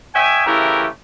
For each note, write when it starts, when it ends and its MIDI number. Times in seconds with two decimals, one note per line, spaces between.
0.15 0.45 73
0.15 0.45 75
0.15 0.45 76
0.15 0.45 79
0.15 0.45 80
0.46 0.86 49
0.46 0.86 52
0.46 0.86 57
0.46 0.86 64
0.46 0.86 67
0.46 0.86 70